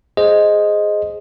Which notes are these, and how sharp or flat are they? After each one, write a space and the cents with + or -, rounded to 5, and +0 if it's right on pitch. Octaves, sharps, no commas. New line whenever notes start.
G#4 +0 C5 +0 D#5 +0